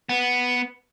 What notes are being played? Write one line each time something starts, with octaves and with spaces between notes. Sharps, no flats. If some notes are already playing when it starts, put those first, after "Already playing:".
B3